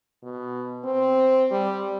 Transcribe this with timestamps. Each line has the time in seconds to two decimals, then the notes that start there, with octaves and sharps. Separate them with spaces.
0.23 B2
0.84 C4
1.51 G3